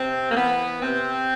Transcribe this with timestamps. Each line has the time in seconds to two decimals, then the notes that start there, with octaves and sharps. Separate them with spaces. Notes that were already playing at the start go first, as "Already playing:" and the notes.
Already playing: C3 C4
0.30 A#3
0.36 E3 B3
0.82 C3 C4